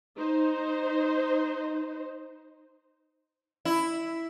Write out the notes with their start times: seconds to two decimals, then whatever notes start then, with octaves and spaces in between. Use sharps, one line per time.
0.17 D#4 C5
3.65 E4